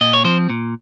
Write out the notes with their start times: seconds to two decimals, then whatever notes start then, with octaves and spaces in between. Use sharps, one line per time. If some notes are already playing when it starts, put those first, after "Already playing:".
0.01 A#2 D#5
0.13 C#5
0.25 F3 C4 C5
0.50 A#2